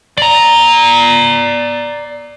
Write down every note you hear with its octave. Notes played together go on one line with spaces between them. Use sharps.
D5 A#5